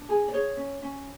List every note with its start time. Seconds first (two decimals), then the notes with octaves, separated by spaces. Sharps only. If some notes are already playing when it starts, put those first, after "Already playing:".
Already playing: D4
0.09 G#4
0.28 D5
0.33 G#4 C#5
0.57 C#4
0.82 C#4